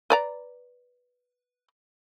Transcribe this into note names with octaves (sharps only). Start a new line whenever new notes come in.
B4 D5 A#5